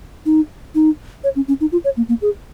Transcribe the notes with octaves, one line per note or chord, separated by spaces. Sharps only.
D#4
D#4
C#5
C#4
C#4
D#4
F4
C#5
A#3
A#3
G#4